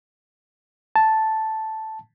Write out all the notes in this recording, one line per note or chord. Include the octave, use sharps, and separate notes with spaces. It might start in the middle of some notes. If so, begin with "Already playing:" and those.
A5